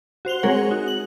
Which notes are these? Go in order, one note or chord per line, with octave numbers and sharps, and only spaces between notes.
F#4 C5 F7 G7
G#3 C4 G#4 A#4 C#5 F#5
D#4 F#4
F#7